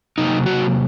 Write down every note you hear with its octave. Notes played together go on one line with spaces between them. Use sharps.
C3 F#3 A#3 D#4
F#4